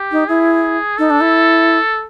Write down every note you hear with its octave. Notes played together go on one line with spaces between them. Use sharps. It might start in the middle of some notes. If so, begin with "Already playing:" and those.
Already playing: G4
D#4
E4 G#4
D#4 A4
D4
E4